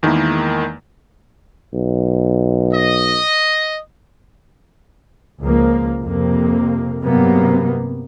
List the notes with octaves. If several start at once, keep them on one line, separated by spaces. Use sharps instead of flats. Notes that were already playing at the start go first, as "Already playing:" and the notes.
E2 D#3 G#3 A#3 E4
B1
D#5
C#2 F3 A#3
F2 C3 A#3
G2 C3 F#3 A#3 B3